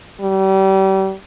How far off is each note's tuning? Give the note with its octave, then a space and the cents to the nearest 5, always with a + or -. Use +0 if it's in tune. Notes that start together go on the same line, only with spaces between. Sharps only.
G3 -35